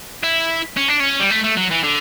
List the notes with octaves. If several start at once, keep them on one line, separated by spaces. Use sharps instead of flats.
E4
C#4
D4
C#4
G3
A3
A3
F#3
E3
D3